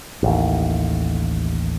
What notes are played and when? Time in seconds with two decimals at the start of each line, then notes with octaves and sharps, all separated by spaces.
0.23 A1 D#2